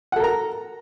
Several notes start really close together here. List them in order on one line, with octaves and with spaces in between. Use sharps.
F#5 A4 A#4 A#5